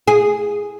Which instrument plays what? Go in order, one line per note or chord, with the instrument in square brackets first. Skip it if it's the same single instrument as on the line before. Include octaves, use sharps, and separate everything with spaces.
[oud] G#4